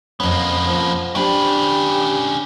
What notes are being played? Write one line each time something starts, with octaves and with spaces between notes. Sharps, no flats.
F2 A#3 B3 C#4
F3
C#4 D4 G4 B4 C5 G5